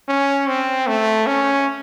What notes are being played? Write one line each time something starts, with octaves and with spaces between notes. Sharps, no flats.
C#4
C4
A3
C#4